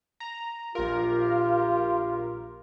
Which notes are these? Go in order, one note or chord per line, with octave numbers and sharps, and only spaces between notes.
A#5
A#1 F4 G4 A#4